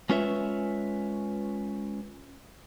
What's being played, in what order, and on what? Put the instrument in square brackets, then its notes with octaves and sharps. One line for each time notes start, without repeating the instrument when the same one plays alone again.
[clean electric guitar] G#3 C#4 F4 B4 C#5 E5